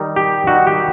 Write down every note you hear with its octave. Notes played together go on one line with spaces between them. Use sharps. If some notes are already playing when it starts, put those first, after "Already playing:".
Already playing: D#3 G3 D#4
G4
D#3 G3 D#4 F#4
G4